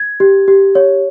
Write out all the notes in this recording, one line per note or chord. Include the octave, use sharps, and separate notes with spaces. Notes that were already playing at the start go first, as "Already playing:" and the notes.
Already playing: G#6
G4
G4
C#5